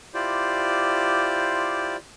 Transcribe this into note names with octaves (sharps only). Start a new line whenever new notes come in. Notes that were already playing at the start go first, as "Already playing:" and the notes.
E4 F4 G4 C5 D5